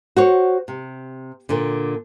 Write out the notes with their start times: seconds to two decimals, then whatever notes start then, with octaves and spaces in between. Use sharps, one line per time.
0.16 F#4 C5 C#5
0.68 C3
1.49 A#2 D3